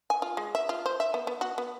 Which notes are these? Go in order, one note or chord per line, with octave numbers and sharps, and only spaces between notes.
G#5
F4
G#3
E5
F4
C5
E5
B3
B3
F#4
B3